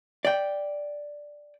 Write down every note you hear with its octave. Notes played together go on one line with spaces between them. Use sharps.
D5 G5